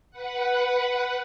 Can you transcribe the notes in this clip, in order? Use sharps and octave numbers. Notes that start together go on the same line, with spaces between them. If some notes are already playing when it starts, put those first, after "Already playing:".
B4 F#5